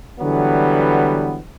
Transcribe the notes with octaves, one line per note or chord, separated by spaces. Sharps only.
D3 E3 F#3 G3 B3